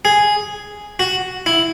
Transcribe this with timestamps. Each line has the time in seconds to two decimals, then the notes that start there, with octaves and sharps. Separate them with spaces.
0.05 G#4
0.99 F#4
1.46 E4